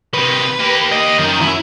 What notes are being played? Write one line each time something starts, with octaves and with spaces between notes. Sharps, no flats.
C3 D#3 B4
A#3 G4
D#5
F#2 D#3
E4